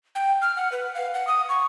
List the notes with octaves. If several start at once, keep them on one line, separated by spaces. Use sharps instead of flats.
G5
F6
F#5
B4
F5
F#5
D#6
C#6